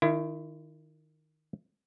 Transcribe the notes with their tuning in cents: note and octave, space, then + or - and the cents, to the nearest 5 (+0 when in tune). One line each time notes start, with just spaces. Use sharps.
D#3 -10 E4 +30